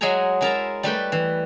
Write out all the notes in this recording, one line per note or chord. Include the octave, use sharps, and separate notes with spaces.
F#3 G#3 G#4 E5 G#5 A#5
G#3 E4 A#4 E5 A5 A#5
G3 A3 B4 G5
E3